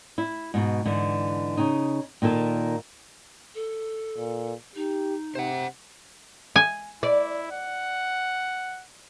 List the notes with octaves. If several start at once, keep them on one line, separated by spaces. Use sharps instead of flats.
E4
G#2 B2
G#2 D3 E3
C#3 D#4
A#2 D#3 A#3 A4
A4
A#2
D#4 G4
C3 C5 F#5
G#5
E4 D5
F#5